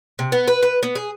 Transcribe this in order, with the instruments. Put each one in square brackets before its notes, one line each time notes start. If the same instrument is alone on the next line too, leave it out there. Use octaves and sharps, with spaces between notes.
[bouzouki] C3
B3
B4
B4
B3
G#4